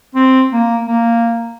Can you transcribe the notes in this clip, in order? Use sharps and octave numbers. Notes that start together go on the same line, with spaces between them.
C4
A#3
A#3